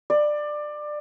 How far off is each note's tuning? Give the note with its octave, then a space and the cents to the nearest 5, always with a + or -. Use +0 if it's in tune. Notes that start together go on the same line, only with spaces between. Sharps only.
D5 +20